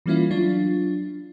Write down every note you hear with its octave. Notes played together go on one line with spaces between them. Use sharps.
E3 G3 A#3 C#4 E4 F4
F#3 D4 F4